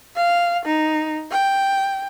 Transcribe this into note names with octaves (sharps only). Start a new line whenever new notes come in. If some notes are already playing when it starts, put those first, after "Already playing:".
F5
D#4
G5